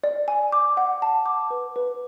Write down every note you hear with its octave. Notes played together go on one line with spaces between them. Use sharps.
D5
G#5
D6
F#5
A5
D6
B4
B4